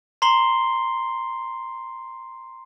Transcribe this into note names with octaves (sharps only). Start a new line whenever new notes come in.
A#5 C6 C7 G7